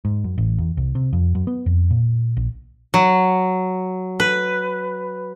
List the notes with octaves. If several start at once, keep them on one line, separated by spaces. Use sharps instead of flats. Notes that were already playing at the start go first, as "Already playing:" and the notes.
G#2
F#2
A1
E2
C2
C3
F2
F#2
B3
F2
A#2
A#1
F#3
B4